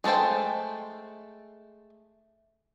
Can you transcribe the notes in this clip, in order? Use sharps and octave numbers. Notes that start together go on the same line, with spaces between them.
G#3 A3 A4 C5 G5